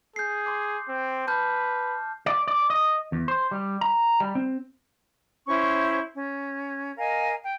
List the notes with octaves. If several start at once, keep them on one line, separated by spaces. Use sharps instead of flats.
G#4 G6 C7
C6 D6
C4
B4 A5 F6 G6
D5
D5
D#5
E2
C5
G3
A#5
G3
C4
C#4 E4 C5 C#6
C#4
A#4 D#5 F5 G#5
G5